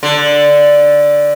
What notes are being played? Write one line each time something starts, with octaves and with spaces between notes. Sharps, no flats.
D3